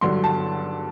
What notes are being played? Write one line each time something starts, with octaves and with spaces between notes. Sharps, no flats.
G2 D3 F#3 C6
A5